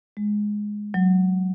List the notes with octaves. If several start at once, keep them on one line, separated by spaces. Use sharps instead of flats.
G#3
F#3